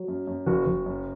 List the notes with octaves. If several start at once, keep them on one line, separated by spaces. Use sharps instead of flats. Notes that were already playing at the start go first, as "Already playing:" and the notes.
Already playing: F#3
F#2
F#2
F#1 F#4
F#1
F#2